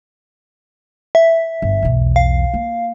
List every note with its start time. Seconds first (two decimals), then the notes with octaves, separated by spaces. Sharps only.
1.15 E5
1.62 G1
1.82 B1 E2
2.16 F5
2.54 A#3